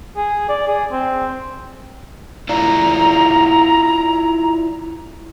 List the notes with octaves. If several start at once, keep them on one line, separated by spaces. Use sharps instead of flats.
G#4
D5
G#4
C4
E4 F4 D5 A#5